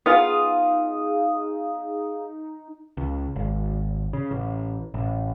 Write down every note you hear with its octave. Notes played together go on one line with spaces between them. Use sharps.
B3 D#4 F4 G#4 F5 D#6
C#2
G#1
C#3
A1
A1